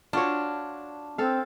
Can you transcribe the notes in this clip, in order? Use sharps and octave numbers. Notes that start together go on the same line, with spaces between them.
D4 F4 F#4 C#5
C4 A4 F5